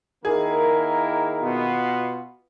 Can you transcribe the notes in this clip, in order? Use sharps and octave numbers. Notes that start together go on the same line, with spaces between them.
D#3 A#3 E4 G#4 A#4
B2 B3 F4